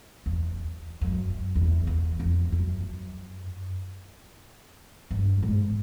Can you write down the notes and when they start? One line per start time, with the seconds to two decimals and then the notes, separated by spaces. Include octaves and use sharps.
0.26 E2
1.01 F#2
1.55 E2
1.87 E2
2.20 F2
2.52 F#2
5.11 G2
5.43 G#2